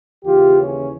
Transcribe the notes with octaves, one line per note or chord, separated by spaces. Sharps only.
D#2 C#3 E3 F4 G4
C#4